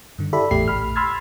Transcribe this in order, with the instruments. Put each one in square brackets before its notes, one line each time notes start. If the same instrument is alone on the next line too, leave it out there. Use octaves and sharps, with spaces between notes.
[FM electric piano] G2 D3
E4 G4 A4 D5 E5 B5
G#1 E2 A2 A3 G4 C7
A#1 B5 F6
B5 C6 E6 F6 G#6 A6